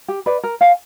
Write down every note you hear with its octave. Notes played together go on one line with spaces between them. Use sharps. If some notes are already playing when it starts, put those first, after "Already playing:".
G4
B4 D5
A#4
C#5 F5 G#5